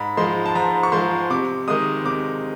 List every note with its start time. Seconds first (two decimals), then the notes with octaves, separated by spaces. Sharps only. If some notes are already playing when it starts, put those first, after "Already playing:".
Already playing: G#2 B5
0.17 F3 G#3 C6
0.46 A5
0.55 G#2 A#5
0.83 C#6
0.92 F3 G#3 C6
1.30 C3 D6
1.68 D#3 G#3 D#6
2.05 C3 D6